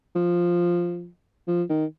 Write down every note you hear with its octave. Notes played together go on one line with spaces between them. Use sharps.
F3
F3
D#3